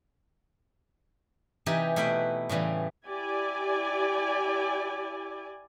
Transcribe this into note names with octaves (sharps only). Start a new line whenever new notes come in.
C3 E3 D#4 G4 E5 G#5
B2 A3 E4 B4 E5 G5
A2 C#3 E3 G3
E4 G4 D5 G#5